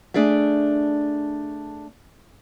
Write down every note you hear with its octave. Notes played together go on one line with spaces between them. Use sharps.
A3 D4 G#4 D5 E5